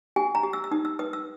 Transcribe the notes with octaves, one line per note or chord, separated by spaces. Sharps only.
G4 G#5
A#5
G4
E6
E6
D#4 D#6
E6
B4 D#6
E6